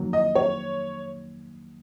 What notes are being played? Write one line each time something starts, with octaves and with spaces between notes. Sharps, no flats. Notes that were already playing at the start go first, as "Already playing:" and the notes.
Already playing: F2 D#3 F#3 A#3
D#5
C#5